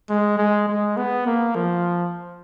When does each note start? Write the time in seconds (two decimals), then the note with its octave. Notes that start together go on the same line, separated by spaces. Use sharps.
0.10 G#3
0.38 G#3
0.68 G#3
0.97 B3
1.26 A#3
1.55 F3